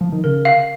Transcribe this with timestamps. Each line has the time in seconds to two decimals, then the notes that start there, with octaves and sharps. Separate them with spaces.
0.01 F3
0.12 D#3
0.24 C#3 A#4
0.45 F5